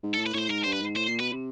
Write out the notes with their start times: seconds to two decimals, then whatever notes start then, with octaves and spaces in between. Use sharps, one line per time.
0.03 G#2
0.14 A4
0.18 A2
0.26 B4
0.34 A2 C#5
0.38 C5
0.49 G#2 A#4
0.64 G2 C5
0.73 B4
0.81 G#2
0.96 A2 C5
1.09 A#2
1.20 B2 B4
1.32 C3